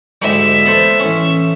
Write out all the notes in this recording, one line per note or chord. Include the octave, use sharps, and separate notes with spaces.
D2 G#2 G3 E5
B3 A4 C5
A1 C#4